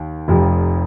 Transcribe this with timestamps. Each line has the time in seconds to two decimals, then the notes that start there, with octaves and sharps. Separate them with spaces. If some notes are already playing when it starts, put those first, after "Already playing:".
Already playing: D#2
0.28 F1 F2 C3 F3